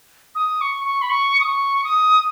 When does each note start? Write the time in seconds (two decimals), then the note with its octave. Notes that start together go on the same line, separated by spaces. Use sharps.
0.35 D#6
0.61 C#6
0.85 C#6
1.02 B5
1.10 C#6
1.40 D#6
1.47 C#6
1.84 D#6